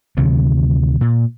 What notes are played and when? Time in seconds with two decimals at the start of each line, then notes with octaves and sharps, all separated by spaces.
0.17 D2 C3 D#3 F#3
1.01 A#2